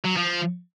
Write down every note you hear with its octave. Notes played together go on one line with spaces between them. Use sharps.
F#3
F3